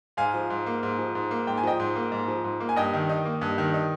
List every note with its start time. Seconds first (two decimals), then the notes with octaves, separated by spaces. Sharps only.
0.17 G#2 F5 G#5
0.34 F3
0.50 G#2
0.66 A#3
0.83 G#2
0.99 F3
1.15 G#2
1.31 A#3
1.47 G#2 G5
1.57 G#5
1.63 F3 D#5 G5
1.80 G#2
1.96 A#3
2.12 G#2
2.28 F3
2.44 G#2
2.60 A#3
2.69 G#5
2.76 G2 D#5 G5
2.93 D#3
3.09 D#4
3.25 A#3
3.41 G2
3.58 D#3
3.74 D#4